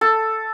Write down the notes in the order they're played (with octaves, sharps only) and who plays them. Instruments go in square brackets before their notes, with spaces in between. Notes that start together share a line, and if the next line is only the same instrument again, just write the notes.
[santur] A4